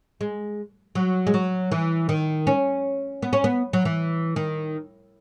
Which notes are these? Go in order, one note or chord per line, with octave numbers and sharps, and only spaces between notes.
G#3
F#3
G#3
F#3
E3
D#3
C#4
B3
C#4
B3
F#3
E3
D#3